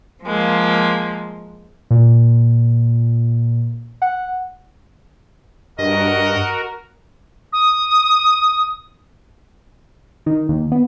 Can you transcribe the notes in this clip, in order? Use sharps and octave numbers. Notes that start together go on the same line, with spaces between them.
F3 G#3 A#3
A#2
F#5
G2 F#4 A#4 D#5
D#6
D#3
D#2
B3